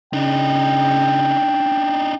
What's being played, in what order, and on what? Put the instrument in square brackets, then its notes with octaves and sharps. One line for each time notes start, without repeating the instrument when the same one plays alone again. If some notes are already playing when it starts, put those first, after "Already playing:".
[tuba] C#3 [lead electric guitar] D4 D#4 [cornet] G5